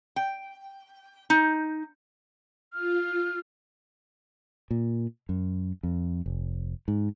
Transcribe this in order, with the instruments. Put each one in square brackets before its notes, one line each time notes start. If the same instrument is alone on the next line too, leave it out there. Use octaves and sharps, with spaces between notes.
[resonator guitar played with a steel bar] G5
D#4
[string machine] F4 [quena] F6
[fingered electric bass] A#2
F#2
F2
F1
G#2